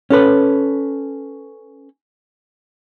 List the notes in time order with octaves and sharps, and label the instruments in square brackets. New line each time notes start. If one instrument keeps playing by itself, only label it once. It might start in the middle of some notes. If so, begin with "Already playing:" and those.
[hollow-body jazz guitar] C#4 A4 B4